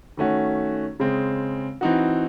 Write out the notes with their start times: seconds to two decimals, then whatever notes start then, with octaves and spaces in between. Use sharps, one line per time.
0.17 D#3 A3 C#4 F#4
1.00 C#3 G#3 C4
1.81 E3 C4 D#4 F#4